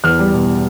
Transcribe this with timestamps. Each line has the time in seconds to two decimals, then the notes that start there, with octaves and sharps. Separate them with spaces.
0.04 E2 F6
0.19 G3
0.33 B2